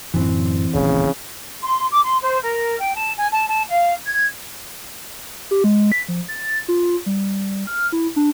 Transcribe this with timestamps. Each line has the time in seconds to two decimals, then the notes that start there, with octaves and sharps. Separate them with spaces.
0.14 F#2 A2 D3 E3 C4
0.74 D#1 A1 A#2 C#3
1.62 C6
1.91 D6
2.04 C6
2.22 C5
2.42 A#4
2.80 G5
2.96 A5
3.17 G#5
3.31 A5
3.48 A5
3.68 F5
4.07 G#6
5.51 G4
5.64 G#3
5.92 B6
6.08 F3
6.28 A6
6.68 F4
7.06 G3
7.67 F6
7.93 E4
8.16 D4